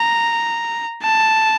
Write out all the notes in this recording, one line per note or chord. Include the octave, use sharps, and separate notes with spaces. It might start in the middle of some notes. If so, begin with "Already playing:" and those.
Already playing: A#5
A5